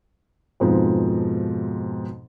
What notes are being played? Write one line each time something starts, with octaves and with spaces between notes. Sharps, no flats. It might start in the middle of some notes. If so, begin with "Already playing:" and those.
F2 G#2 B2 F3